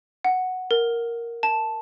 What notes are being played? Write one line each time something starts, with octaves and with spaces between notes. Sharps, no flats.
F#5
A#4
A5